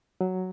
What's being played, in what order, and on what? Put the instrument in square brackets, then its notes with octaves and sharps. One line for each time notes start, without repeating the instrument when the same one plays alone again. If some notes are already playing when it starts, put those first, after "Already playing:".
[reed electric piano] F#3